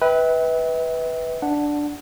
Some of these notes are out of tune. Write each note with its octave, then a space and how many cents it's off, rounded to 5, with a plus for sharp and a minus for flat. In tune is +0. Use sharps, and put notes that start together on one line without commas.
B4 +0 E5 -40 G5 +0
D4 +0 F#5 +0